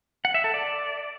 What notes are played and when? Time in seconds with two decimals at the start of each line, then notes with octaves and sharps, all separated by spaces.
0.25 F#5
0.34 E5
0.44 A4
0.54 D5